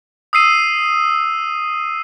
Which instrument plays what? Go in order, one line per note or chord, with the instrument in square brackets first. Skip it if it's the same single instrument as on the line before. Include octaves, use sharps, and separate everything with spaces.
[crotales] D#6 E6 C7 D#7